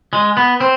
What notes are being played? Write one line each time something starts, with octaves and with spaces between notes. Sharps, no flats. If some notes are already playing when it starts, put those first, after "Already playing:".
G#3
B3
C4